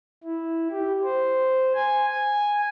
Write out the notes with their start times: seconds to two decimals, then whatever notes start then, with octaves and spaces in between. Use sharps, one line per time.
0.23 E4
0.70 G4
1.04 C5
1.75 G#5
2.10 G#5